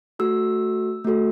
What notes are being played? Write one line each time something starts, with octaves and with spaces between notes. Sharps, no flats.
A3 F#4 A4 E6
A3 F#4 A4